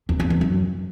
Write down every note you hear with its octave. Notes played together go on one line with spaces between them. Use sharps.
E2
E2
E2
F#2